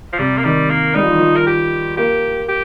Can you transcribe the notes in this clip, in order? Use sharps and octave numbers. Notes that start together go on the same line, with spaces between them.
F3
C3 G3
A#3
D#3 G3
A#3
G3 D#4
F3
D#3
F3
A#4
G4
A#3 G4
G4